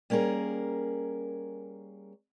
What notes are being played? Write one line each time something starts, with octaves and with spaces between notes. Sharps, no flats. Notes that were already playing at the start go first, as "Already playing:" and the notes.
G3 A#3 C#4 G#4 A#4